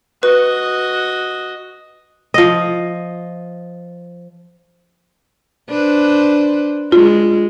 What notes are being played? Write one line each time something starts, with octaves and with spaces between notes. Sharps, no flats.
F#4 B4 D#5
F3 D#5
D4 B4 C5
G#3 F4